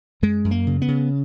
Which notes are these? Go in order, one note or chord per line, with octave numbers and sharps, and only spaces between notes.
F#2 G#3
F#2
A#3
C#3
B3
C#3